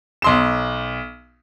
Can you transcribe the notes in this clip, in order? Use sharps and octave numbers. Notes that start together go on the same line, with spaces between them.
B1 C6 E7